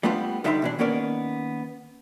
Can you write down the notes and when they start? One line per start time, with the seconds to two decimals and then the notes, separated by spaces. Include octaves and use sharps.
0.03 G3 A3 B3 D4 F4
0.44 D3 G3 D#4 E5 B5 C6
0.62 B2 E3 D4
0.79 D#3 A#3 B3 C#4 A#4 D5